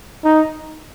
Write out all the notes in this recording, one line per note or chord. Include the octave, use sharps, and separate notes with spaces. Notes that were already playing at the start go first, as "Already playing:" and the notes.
D#4